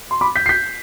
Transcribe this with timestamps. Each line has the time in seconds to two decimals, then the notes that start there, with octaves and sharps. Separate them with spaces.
0.11 C6
0.21 B5 D6
0.36 G6 B6
0.46 C7
0.49 G6 B6